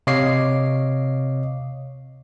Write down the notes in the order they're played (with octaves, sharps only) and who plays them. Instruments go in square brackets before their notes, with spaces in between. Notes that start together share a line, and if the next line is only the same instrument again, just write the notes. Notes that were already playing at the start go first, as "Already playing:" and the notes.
[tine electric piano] C3 C#5 D#5 F5 D6 C7